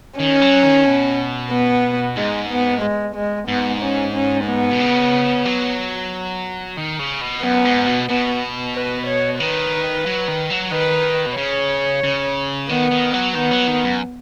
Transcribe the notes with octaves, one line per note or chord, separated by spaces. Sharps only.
D#3 C#4
F#3
D#3
B2
B3
G#2 G#3
B3
G#3
G#3
G#2 B3
C#4
C#4
B3
B2
C#3
F#3
D#3
C#3
B2
F#2 B3
G#2
B2
B2 B3
B4
C#5
D#3 B4
F#3
D#3
F#3
D#3 B4
B2
C#3 C#5
C#3
D#3 B3
D#3
F#3
D#3 B3
F#3
D#3
F#2